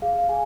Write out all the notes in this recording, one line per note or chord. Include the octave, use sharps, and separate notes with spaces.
G#4 F5
F5
G#4 G#5